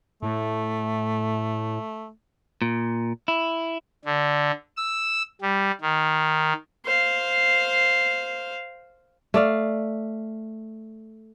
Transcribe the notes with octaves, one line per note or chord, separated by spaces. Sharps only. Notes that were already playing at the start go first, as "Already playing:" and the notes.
A2 A3
A#2
E4
D3
E6
G3
D#3
C5 F5
A3 D5 F5